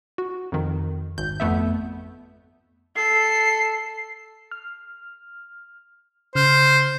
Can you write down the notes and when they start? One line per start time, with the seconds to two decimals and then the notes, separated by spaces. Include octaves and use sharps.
0.18 F#4
0.52 F2 D#3
1.18 G#1 G6
1.40 F2 A3 B3 E5
2.96 A4 C7
4.51 F6
6.35 C#3 C5 F6